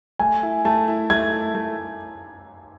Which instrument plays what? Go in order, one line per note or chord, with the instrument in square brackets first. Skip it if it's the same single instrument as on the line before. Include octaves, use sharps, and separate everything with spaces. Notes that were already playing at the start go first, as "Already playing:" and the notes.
[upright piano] A3 [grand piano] G#5
[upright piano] E4
[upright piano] A3 [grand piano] A5
[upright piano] E4
[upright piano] A3 [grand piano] G#6
[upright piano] E4
A3